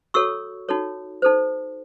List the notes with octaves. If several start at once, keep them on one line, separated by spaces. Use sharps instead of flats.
F#4 A4 C#5 C#6 E6
D#4 F#4 A4 C#5
D#4 A4 C5